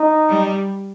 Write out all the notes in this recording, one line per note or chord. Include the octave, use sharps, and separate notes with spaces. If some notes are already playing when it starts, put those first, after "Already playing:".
Already playing: D#4
G3